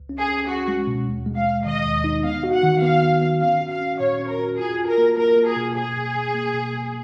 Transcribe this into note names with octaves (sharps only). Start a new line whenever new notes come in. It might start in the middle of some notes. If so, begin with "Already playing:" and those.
Already playing: C#2
C#4
G#4
C#4
C#4 F#4
G#3
B2
D#2
G#3
F5
G#3
D#3 D#5
D#2
D#4
B3 F5
F#4
F#5
D#3
B3 F5
B3
B3
C#4 F5
F#4
F5
C#4
A#2 C#5
C#4
A#4
F#4
F4 G#4
F4
A#4
A#3
A#3 A#4
A#3
G#4
B2
B2 G#4
B2
B2
A#3
B2
B2